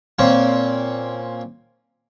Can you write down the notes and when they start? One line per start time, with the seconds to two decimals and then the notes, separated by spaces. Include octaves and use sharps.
0.19 A#2 C4 C#4